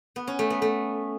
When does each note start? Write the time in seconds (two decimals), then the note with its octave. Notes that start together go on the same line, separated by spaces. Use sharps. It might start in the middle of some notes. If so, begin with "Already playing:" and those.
0.16 B3
0.27 C#4
0.39 A3
0.50 B3
0.62 A3